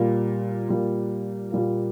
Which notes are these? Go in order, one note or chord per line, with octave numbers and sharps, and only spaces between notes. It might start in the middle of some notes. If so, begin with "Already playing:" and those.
Already playing: A#2 G3 A#3
A#2 G3 A#3
A#2 G3 A#3